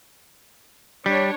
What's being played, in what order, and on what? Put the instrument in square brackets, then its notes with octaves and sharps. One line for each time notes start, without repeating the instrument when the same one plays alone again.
[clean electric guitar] G3 [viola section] D4 C#5